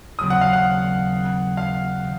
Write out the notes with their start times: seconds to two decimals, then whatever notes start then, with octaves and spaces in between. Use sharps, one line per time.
0.19 D#2 C#3 F#3 C4 D#6
0.30 F#5
0.41 F5
0.53 F#5
1.57 F5
2.04 D#3